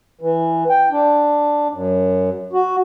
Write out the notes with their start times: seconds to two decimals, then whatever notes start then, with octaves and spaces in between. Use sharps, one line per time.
0.21 E3
0.70 G5
0.91 D4
1.73 F#2
2.53 F#4